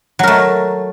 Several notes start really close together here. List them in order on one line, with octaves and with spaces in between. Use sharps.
F#3 A#4 A3